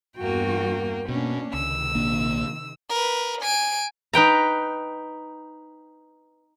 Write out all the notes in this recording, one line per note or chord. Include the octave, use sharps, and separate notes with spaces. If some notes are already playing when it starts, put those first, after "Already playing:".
E2 G2 A#3 F#4 G5
B2 A#3 C#4 D4
C#2 C3 D#3 E6
A#1 A#3 D4
A#4 B4
G#5 D7
D#4 B4 G5 A#5